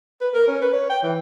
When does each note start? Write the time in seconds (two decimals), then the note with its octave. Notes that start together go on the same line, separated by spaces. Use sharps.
0.21 B4
0.34 A#4
0.48 C#4
0.62 B4
0.73 C#5
0.90 G5
1.03 E3